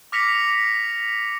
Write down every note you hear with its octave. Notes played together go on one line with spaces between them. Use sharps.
D6 F6 A#6 B6 C#7 F7